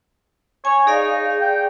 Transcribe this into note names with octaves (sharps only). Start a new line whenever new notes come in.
C#5 G#5
D#4 G#4 D5 F5
G5